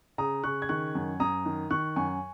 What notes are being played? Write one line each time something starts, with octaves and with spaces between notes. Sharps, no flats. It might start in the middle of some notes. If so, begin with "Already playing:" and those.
C#3 A#5 D#6
C#3 C#6 F#6
G#6
D#3 C#6 F#6
F#2
F#2 A#5 D#6
D#3
D#3 C#6 F#6
F#2 G#5 C#6